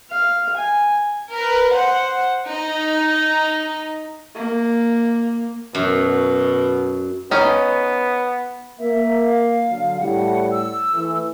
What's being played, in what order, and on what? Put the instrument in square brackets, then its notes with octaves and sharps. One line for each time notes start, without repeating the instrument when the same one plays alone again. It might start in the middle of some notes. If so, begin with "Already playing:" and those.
[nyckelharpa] F5
G#5
[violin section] A#4 B4
C5 F#5
D#4
[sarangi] A#3
[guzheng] F#2 [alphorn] B2
[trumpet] B3 [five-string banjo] C#4 D#4
[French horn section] A#3 [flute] E5
[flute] F5
[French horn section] D3 F#3
[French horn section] A2 G3 [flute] F#5
[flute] E6
[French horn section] E3 A3